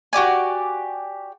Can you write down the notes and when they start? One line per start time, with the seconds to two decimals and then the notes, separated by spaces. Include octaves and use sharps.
0.13 F#4 G4 D5 G#5